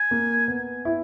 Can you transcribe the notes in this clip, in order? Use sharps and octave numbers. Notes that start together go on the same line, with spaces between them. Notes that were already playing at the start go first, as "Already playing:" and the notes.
Already playing: G#5
A#3
B3
E4